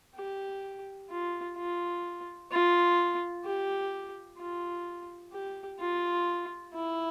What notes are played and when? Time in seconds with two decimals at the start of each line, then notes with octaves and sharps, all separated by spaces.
0.15 G4
1.10 F4
1.57 F4
2.51 F4
3.45 G4
4.39 F4
5.33 G4
5.80 F4
6.74 E4